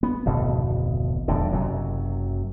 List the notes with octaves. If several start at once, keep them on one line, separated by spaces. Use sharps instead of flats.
B3
D1 G#1 F2 B2
D#1 E2 A2 D3
F#1 F#2 C3 F#3